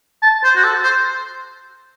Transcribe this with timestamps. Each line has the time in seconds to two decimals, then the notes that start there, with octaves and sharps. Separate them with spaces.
0.22 A5
0.44 C5
0.56 F#4
0.64 A4
0.83 C5